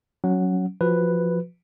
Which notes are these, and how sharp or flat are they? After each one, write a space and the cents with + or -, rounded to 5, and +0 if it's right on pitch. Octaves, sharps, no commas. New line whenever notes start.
F#3 +0 C#4 +0 F#5 +0
F3 +0 F#4 +0 B4 +0